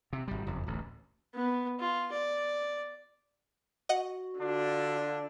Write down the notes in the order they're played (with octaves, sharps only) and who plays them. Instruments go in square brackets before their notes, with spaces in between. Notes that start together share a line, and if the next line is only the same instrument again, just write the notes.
[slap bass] C3
G#1 G3
F#1 F2
D1 A1
[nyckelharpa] B3
F4
D5
[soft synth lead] F#4 [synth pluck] D#5 F#5
[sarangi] D3 [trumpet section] D4 F4